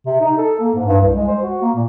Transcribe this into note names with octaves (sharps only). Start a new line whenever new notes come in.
C3
D#4
A4
A#3
G#2
G2
C2
G#3
C5
F#4
A#3
A#2